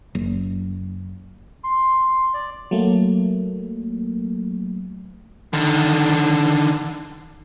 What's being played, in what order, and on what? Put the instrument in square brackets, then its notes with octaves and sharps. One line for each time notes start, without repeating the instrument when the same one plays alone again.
[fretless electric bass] F#1
[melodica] C6
D5
[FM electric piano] F#3 A3 A#3
[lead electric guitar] D3 D#3